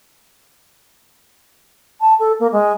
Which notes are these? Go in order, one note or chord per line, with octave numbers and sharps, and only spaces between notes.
A5
A4
A#3
G#3